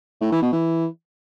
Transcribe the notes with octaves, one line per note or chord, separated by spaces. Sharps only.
A2
E3
B2
E3